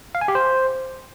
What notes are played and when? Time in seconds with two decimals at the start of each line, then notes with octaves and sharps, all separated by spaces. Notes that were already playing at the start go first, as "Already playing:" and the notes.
0.15 F5
0.21 G#5
0.28 G4
0.35 C5